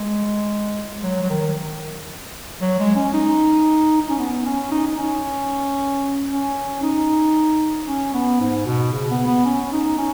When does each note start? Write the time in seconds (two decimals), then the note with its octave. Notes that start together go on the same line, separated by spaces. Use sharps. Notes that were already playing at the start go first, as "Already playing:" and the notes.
Already playing: G#3
1.03 F#3
1.22 F#3
1.30 D#3
2.61 F#3
2.79 G#3
2.96 C#4
3.13 D#4
4.01 D#4
4.10 C#4
4.19 B3
4.46 C#4
4.71 D#4
4.87 D#4
4.98 C#4
6.30 C#4
6.82 D#4
7.87 C#4
8.14 B3
8.40 G#2
8.66 B2
8.93 C#3
9.10 B3
9.27 B3
9.45 C#4
9.72 D#4
9.98 C#4